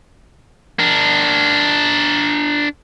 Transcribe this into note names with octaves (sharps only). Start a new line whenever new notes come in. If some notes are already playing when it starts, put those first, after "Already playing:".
D4 A#4